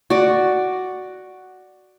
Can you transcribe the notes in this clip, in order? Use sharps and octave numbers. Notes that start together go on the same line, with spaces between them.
F#4 D5